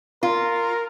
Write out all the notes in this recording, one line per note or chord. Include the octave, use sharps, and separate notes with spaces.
F4 A#4